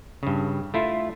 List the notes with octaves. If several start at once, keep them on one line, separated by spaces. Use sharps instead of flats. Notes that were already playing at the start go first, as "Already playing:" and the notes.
G2 C#3
A3 E4 F4